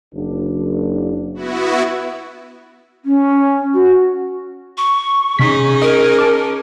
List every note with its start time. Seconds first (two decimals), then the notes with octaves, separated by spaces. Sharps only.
0.15 F#1 D4
1.35 B3 E4 F#4
3.05 C#4
3.74 F#4
4.78 C#6
5.39 C3 C#4 D#4 G#4 B6
5.82 A#4 D#5
6.19 A5 D6